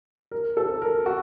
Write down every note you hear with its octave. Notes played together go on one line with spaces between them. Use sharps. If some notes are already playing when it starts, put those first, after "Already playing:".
A#4
A4
A#4
F#4